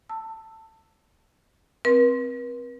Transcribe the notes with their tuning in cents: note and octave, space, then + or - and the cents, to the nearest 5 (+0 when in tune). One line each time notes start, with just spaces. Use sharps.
A5 +20 E6 +0
C4 +0 B4 -45